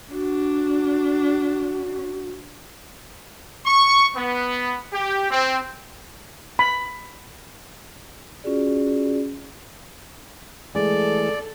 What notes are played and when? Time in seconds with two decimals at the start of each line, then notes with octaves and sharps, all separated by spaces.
0.12 D4 F#4
3.66 C#6
4.16 B3
4.93 G4
5.30 C4
6.59 B5
8.44 C#4 F4 F#4 G#4 D5
10.75 E3 G#3 A3 G#4 A4 D5